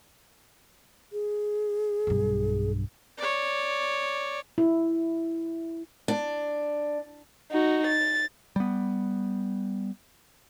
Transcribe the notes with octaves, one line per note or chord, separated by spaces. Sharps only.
G#4
B1 G2
C#5 D5
E4
D4
D#4 F#4
A6
G3 B3